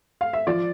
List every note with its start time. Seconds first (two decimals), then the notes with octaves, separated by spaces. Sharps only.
0.21 F5
0.33 E5
0.47 F3 D5